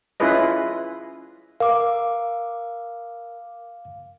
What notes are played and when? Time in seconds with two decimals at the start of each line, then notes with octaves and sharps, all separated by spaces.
0.20 C#4 E4 F4 G#4 B4 D#5
1.60 A#4 F5 D6